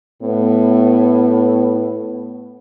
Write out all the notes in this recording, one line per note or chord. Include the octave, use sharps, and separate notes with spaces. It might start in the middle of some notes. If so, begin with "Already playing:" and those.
A2 B3